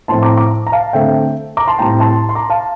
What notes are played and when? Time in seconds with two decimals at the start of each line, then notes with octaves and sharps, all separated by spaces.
0.08 A2 F3 C4 A5 C6
0.22 A#5 D6
0.37 A#5 D6
0.67 A#5
0.72 F5 A5
0.93 D3 A3 C4 E5 G5
1.57 A#5 D6
1.68 A5 C6
1.79 A2 G3 C4 G5 A#5
2.00 A5 C6
2.29 C6
2.35 A#5 D6
2.50 F5 A5